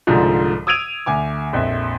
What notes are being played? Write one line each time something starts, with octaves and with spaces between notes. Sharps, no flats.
C2 G#2 D3 F3
D#6 E6 G#6 D7 D#7 F7
D2 G#5 D6
A#1 F2 D#5 E5